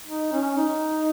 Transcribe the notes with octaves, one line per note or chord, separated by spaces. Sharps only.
D#4
C#4
D#4